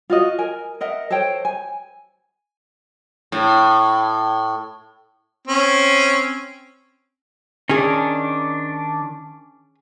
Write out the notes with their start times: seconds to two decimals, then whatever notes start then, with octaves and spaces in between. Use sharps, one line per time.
0.10 F4 F#4 D#5
0.38 A#4 G#5
0.81 A#4 D#5 E5 F#5
1.11 A4 C5 C#5 G5
1.45 G#5
3.32 A2
5.48 C4 C#4
7.70 D#3 C#4 D4 G#4